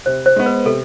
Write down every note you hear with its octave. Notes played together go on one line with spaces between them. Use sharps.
C3 C5
C5
G#3 B3
B4
C3 A4